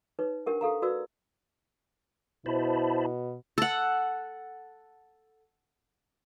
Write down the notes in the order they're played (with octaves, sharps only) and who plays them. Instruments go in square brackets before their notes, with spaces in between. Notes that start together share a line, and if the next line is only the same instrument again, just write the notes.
[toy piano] D#4 B4 C#5
D4 G4 A#4 F#5
G4 A4 F5 A#5
F#4 B4 D5 E6
[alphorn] B2 [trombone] E4 [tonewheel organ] C5 A5 B5
[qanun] A4 F#5